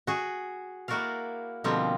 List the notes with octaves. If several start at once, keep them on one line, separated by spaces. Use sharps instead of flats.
F#4 G#4
A#3 E4 F#4 A#4 D5 F5
B2 D3 F3 G3 A#3 C4